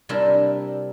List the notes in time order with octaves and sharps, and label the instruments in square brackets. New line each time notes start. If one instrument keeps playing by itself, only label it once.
[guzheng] C3 G3 D4 E4 G4 A#4